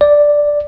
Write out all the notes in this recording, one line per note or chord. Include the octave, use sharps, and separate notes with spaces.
D5